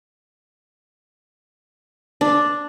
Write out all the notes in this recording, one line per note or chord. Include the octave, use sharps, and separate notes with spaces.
D4